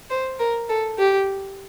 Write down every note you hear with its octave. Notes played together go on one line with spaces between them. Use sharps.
C5
A#4
A4
G4